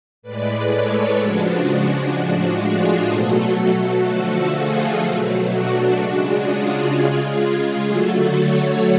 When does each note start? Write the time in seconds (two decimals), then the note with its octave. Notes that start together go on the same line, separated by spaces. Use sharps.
0.22 A2 G#3 B4 D5
0.70 A4 C#5
1.18 C#3 F3 G#3 D4 F#4
2.13 A2 F3 G#3
2.60 F4 G#4
3.08 B2 F#3 A3 F#4 A4
4.03 D3 F3 A3 F#4 A4
4.51 F4 G#4
4.98 B2 F#3 A3
5.46 D4 F#4
5.94 C#3 G#3
6.42 F4 G#4
6.89 C#3 G#3
7.84 D3 F#3 A3 F#4 A4
8.32 A4 C#5